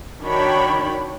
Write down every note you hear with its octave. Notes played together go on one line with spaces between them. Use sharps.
D#3 D4 F#4 C#5 G5 B5